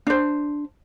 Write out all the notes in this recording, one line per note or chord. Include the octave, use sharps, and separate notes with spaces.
D4 C5